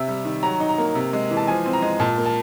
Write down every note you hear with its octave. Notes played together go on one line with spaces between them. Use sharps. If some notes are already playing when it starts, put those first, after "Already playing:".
Already playing: C3 E5
G3
D#3
F#3 A#5
D#4
A#5
A#3
C3
G#3
E3
A5
F3 G#5
C4
A#5
G#3
A#2 A5
A#3
A5